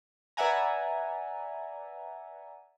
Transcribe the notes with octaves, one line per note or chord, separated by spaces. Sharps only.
B4 D5 E5 F#5 G#5 A#5